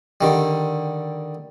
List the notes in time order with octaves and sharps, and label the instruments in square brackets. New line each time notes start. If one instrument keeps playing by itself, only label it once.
[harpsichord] D3 D#3 G3